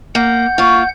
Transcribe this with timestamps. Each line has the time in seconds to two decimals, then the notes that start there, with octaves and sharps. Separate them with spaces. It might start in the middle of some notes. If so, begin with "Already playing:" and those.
0.15 A#3 F#5 G6
0.58 A#3 F4 C#6